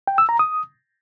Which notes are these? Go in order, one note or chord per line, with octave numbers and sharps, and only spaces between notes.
G5
E6
A#5
D#6